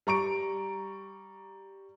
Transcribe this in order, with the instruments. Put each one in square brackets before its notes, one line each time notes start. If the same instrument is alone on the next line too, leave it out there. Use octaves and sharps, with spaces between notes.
[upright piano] G3 A#5 C#6 D7